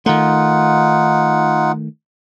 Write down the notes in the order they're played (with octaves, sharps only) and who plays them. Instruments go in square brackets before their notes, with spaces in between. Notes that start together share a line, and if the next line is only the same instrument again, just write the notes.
[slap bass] D#3 A3 [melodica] D#4 F4 F#5